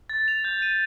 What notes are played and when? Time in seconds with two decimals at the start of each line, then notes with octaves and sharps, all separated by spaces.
0.10 A6
0.28 F7
0.44 G6
0.62 D#7